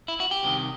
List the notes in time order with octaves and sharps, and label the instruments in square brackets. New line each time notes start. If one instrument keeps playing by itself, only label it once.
[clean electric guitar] E4
F#4
G4
C2 C3 D#3